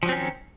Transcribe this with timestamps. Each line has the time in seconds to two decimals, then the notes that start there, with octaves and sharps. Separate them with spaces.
0.03 F3
0.06 F#3
0.09 C4
0.12 C#4
0.15 D#3